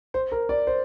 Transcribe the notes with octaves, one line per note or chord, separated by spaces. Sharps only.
C5
A#4
D5
C5